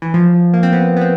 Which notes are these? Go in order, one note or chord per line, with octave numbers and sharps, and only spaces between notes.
E3
F3
A#3
C4
B3
B3
C4